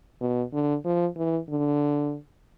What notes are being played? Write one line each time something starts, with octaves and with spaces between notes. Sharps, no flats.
B2
D3
F3
E3
D3